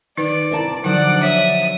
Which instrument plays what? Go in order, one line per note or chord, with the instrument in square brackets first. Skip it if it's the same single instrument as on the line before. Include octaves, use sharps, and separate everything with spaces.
[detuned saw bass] D#3 [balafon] D#4 B4 [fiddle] D5
[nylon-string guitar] C3 A#4 A5 [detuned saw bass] E4
[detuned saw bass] D3 [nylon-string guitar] F3 F#3 [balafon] D#4 [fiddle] D5 F#5
[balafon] C#5 [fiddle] E5 D#6